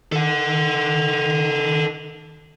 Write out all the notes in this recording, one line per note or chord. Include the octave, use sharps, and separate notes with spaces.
D#3 A4 F#5